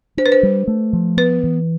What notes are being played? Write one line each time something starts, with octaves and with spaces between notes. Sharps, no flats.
D4 C5
B4
C5
G3
A3
F3
B3 B4
E3